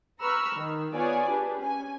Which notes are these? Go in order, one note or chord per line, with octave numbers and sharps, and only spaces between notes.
B4 A#5 B5 C#6 E6 F6
D#3
B3 F4 G#4 C#5 D5 G#5
D4 G4 G#4 B4
C#4 G#5